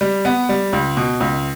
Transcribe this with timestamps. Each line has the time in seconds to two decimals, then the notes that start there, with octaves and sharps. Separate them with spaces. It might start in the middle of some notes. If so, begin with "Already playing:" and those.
0.01 G3
0.25 B3
0.49 G3
0.73 C#2
0.97 B2
1.20 C#2